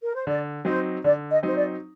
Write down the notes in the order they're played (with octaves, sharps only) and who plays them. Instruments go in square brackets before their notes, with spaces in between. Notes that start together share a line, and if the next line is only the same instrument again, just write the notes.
[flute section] A#4
C5
[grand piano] D3 [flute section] D5
[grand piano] F#3 C4 D#4 [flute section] C5
[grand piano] D3 [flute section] D5
[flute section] D#5
[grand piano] F#3 C4 D#4 [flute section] C5
[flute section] D5